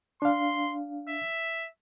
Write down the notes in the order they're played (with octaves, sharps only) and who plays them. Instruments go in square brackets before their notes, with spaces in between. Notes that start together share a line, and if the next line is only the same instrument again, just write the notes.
[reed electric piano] D4 F5 [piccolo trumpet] C6
[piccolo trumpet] E5